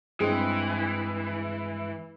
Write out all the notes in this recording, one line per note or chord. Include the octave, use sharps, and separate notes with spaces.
G2 E3 G#3 C4 G#4